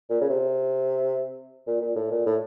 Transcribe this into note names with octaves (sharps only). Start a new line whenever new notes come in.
A#2
C#3
C3
A#2
A#2
A2
A#2
A2